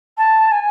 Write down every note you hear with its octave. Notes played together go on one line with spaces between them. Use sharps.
A5
G#5